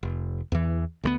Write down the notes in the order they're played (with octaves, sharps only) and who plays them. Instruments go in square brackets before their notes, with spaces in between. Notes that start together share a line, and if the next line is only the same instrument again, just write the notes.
[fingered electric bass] F1
E2 E3
D2 G3 B3